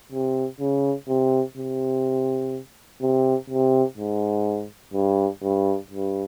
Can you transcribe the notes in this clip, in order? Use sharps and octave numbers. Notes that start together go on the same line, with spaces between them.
C3
C#3
C3
C3
C3
C3
G#2
G2
G2
G2